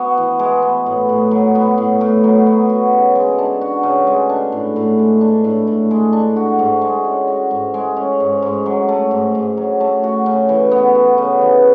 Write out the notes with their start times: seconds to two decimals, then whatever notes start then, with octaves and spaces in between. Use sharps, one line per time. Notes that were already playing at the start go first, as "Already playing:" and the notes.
Already playing: B3 F#4
0.17 E3
0.39 G#3
0.62 B3
0.86 A2
1.09 A2
1.31 F#3
1.55 B3
1.78 A2
2.01 A2
2.24 F#3
2.46 B3
2.69 F#4
2.93 C#3
3.15 G#3
3.38 D4
3.61 F#4
3.83 C#3
4.07 G#3
4.29 D4
4.52 A2
4.76 A2
4.99 G#3
5.21 D4
5.44 A2
5.67 A2
5.91 G#3
6.13 D4
6.36 F#4
6.59 G#2
6.82 G#3
7.04 C#4
7.27 F#4
7.51 G#2
7.74 G#3
7.97 C#4
8.20 G#2
8.42 G#2
8.66 F#3
8.88 A3
9.11 G#2
9.35 G#2
9.57 F#3
9.80 A3
10.03 F#4
10.26 C#3
10.49 E3
10.71 B3
10.95 F#4
11.18 C#3
11.41 E3